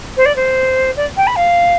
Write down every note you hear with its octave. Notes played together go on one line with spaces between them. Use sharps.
C5
D5
C5
D5
G5
B5
F5